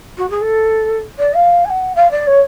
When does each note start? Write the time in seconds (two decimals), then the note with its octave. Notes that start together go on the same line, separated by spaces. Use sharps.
0.17 F#4
0.30 G#4
0.41 A4
1.18 D5
1.33 F5
1.64 G#5
1.69 F#5
1.95 F5
2.11 D5
2.26 C#5